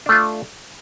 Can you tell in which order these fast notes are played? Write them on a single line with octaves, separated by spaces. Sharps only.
D4 A3 F4